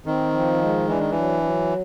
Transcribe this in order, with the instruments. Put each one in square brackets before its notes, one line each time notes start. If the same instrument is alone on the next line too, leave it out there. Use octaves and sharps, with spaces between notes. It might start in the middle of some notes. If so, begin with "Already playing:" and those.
[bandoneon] D#3 [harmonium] C4
[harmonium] F3
G#3
[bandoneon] E3 [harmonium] D4
[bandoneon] D#3
[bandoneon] E3 [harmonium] F#3
[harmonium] F#3